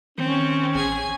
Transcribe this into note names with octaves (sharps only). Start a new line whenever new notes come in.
D#3 C4 C#4
A1 G#4 G#5